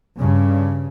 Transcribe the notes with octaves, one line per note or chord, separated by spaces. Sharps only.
G2 C#3